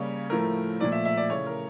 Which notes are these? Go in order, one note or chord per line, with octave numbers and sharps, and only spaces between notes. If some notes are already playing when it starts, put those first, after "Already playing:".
Already playing: C#3 G3 A#3 C#5
A2 F3 A3 A#4
A#2 F3 A3 D5
E5
E5
D5
C#3 E3 A3 C#5
A#4